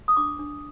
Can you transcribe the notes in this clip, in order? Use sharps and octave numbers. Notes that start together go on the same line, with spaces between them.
D#6
D4 D6
D4